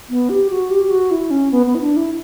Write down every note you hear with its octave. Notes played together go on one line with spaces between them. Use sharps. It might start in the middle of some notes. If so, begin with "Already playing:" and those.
B3
G4
F#4
G4
G4
F#4
E4
C#4
B3
B3
E4
D4
E4